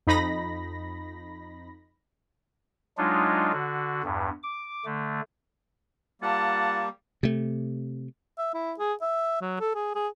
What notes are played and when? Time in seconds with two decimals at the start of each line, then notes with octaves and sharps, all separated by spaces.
0.07 F2 D#4 B5 A#6
2.98 F#3 G#3 D4 D#4 F4
3.53 D3 F#4
4.03 E2 G2
4.43 D6
4.85 D3 A3
6.22 G3 A#3 F4 F#5 A5
7.23 C3 A3
8.38 E5
8.54 E4
8.79 G#4
9.01 E5
9.42 F#3
9.60 A4
9.75 G#4
9.95 G#4